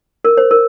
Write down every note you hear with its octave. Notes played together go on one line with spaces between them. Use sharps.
A#4
C5
A#4